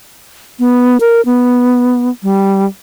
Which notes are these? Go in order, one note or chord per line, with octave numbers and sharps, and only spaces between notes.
B3
A#4
B3
G3